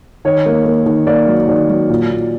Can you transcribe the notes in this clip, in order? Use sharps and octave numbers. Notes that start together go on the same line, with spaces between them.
D#3 C#5
A#3
A#3
D#3
A#3 D5
F#3
D#3 D5
F#3
A#2
A#2